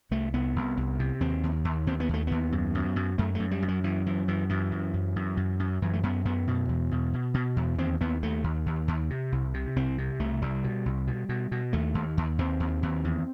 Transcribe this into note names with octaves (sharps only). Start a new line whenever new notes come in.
C2 A3
C2 B3
C2
C2
C3
D#2 C4
D#2
D#2
D#2 C4
B3
D#2 A3
D#2 B3
F#2
F#2
F#2
F#2 A3
F#2 A3
G3
F#2
F#3
F#2 E3
F#2 E3
F#2 E3
F#2 E3
F#2
F#2
F#2
F#2
F#2
F#2 E3
A3
F#2 B3
F#2 B3
B2
E2
B2
B2
B2
E2
D#2 C4
D#2 B3
D#2 A3
D#2
D#2
D#2
C3
C2
C3
C2 C4
C3
C2 A3
C2 G3
B2
C2
B2
B2
B2
D#2 A3
D#2
D#2
D#2 C4
D#2
D#2
E2